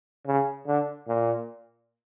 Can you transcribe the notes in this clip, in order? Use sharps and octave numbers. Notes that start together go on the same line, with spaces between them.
C#3
D3
A#2